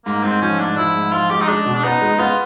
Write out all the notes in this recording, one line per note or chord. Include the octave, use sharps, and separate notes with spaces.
G#2 A#3
G#2 C4
F3 C#4
G#2 D4
F3 E4
G#2
F3 F4
G#3 G4
D#4
G#3 D4
B2
D4
B3 D#4
G#3
B3 F4